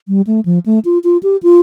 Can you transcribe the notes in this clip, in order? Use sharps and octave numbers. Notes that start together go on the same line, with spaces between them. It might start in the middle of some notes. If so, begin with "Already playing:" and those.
G3
A3
F3
A3
F4
F4
G4
F4